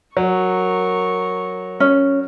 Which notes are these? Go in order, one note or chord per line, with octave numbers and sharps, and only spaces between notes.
F#3 A#4 C#6
C#4